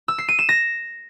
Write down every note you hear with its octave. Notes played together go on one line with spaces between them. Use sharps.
E6
C7
D#7
E7
A#6